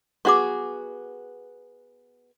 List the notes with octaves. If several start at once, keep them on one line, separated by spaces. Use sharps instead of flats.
B3 F#4 G#4 C#6 D6